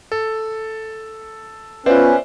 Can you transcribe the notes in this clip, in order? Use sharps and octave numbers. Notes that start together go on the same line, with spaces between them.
A4
B3 C#4 F4 B4 C5 D5 E5